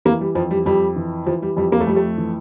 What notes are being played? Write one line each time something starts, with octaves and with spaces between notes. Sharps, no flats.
E3 A#3
G3
F2 F3
G3
F2 G3
E3
E3 F3
G3
F2 G3
A#3
A3
F2 G3
A3
E3